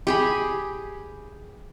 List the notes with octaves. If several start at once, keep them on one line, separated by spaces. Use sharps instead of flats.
G4 G#4 B5